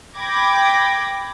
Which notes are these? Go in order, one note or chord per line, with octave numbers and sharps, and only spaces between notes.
G5 B5 D6 G#6 A#6